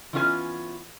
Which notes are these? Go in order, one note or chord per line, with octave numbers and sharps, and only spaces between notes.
E3 B3 C#4 F4 B4 G#5